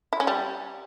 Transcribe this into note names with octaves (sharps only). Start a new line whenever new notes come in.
E4
C#4
G3